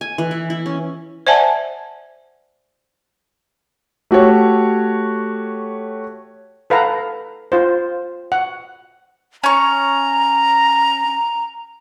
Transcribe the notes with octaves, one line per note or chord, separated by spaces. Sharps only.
G#5
E3
E4
E4
C#4
C5 D5 E5 F#5 G#5 A5
A3 F#4 G4 C#5
A4 B4 F5 F#5 A#5
F4 C5
F#5
C#4 A#5 C#6